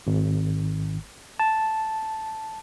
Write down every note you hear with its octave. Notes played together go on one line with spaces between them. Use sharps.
G#1
A5